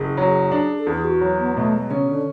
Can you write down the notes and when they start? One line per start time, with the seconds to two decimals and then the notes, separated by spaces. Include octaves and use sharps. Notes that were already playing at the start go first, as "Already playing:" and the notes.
Already playing: F#1 G#4
0.17 F#3
0.51 D4
0.79 A4
0.86 E2 G#4
1.04 F#4
1.21 F#3
1.39 B3
1.55 B2 A3
1.74 G#3
1.90 C#3 C#4
2.08 D3